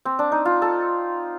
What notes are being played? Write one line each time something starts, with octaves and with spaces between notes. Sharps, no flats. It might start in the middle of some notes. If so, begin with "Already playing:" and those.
C4
D4
D#4
F4
A4